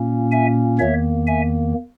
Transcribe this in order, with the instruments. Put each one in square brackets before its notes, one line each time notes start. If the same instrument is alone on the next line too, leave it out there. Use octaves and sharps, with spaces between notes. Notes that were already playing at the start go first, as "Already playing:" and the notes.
Already playing: [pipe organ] A#2 A#3 C#4
E5 G#5
E2 D#3 A#3 C#5 E5
E5 G#5